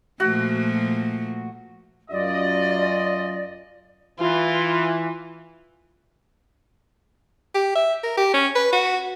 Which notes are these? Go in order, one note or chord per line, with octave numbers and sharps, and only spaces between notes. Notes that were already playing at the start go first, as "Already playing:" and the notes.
A#2 F3 A3 F#4
F#2 F4 D5 D#5
E3 F4
G4
E5
A#4
G4
C#4
B4
F#4